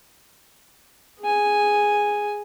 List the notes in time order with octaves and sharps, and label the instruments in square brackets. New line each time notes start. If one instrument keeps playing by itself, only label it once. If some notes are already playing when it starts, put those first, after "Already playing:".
[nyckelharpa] G#4 G#5